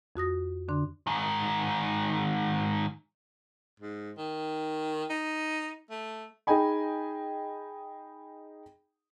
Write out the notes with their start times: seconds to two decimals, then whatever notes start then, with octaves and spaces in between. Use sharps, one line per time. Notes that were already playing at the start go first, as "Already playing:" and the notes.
0.16 F2 F#4 D#6 A#6
0.69 F2 D3 D4 C6
1.07 G#2 D#3
3.80 G#2
4.18 D#3
5.10 D#4
5.90 A3
6.47 D#4 G#4 D#5 G5 G#5 B5